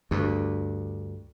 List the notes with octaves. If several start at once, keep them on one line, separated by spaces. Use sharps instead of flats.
D2 G2